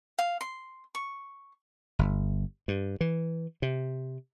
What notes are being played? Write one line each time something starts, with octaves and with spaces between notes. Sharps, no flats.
F5
C6
C#6
G1
G2
E3
C3